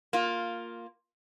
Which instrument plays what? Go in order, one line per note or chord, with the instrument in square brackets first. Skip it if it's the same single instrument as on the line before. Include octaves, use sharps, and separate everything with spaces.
[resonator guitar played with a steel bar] A#3 F4